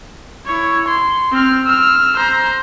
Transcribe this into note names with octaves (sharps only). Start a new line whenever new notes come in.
E4 C#5
C6
C4 F6
E6 F6
C5 A#5